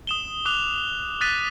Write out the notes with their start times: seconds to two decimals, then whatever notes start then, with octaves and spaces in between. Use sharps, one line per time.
0.07 D#6 E7 G7
0.45 D6 D#6 F#6 F7
1.21 D#6 F#6 A6 B6 D#7 G7